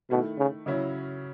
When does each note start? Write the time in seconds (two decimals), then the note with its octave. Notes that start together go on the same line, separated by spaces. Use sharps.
0.10 B2 D#3 A3 E4
0.38 C#3
0.66 C#3 F#3 C#4 E4